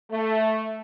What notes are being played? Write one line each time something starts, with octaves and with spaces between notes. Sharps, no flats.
A3